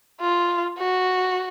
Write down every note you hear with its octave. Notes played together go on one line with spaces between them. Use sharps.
F4
F#4